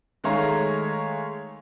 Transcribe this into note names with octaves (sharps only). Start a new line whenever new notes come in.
D#3 G#3 A3 C#5 F5 A#5